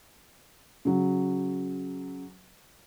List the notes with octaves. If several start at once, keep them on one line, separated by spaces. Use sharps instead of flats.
C#3 F#3